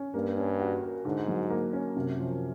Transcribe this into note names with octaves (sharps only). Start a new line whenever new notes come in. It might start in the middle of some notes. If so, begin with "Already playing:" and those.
Already playing: C#4
G2 A#3
C#4
F#4
A#4
G#2 D3
F#3
A#3
C#4
F#2 C3
F3